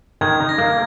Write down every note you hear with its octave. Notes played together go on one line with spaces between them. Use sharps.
D#3 G#6
D#4
A#6
A#3